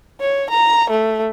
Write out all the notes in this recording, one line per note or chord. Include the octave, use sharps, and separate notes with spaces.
C#5
A#5
A3